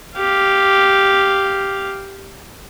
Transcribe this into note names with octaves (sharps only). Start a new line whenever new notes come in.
G4 F5